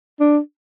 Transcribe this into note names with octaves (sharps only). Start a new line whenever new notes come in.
D4